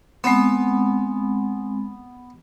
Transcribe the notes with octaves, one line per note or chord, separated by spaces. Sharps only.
G#3 B3 C4